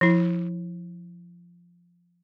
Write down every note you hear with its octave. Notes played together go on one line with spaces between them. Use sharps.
F3 E4